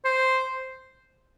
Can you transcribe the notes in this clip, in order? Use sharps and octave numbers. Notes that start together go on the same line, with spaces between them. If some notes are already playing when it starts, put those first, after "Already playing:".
C5